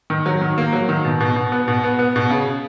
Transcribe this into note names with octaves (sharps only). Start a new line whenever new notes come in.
D#3
F#3
D#3
A#3
F#3
D#3
B2
B2
B2
B3
B2
B3
B3
B2
C#3